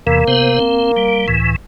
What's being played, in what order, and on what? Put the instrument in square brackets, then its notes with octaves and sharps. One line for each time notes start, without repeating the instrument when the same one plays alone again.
[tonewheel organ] E2 C3 E3 [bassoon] A#3
[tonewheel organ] C3 B3 C5
C4
G3
C#2 A2 E3